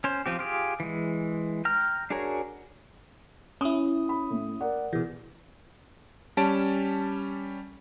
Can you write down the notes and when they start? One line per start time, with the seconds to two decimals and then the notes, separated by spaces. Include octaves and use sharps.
0.04 C#4 C5
0.26 F3 C4 G4
0.39 F4 G4 G#4
0.80 E3 G#3
1.65 G5 A#5 F6
2.10 D4 F#4 G#4 A#4 C#5
3.61 C#4 E4 D#6
4.09 B5
4.30 A2
4.60 A#4 D5 F#5
4.93 B2 E3 G#4
6.37 G3 C#4 A5 D7